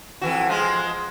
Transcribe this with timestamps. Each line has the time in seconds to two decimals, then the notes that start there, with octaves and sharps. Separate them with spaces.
0.21 F2 E3 F#4
0.49 F3 G#3 F4